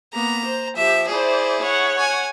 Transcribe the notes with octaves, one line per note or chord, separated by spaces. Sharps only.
A#3 B3 A#5
C5
F3 G4 E5
E4 G#4 C5 D5
C#5 F#5
G#5